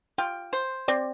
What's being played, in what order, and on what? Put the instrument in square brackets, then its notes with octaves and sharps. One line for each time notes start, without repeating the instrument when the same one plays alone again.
[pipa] F4 [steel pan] G5
[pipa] C5
[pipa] C4 [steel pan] D5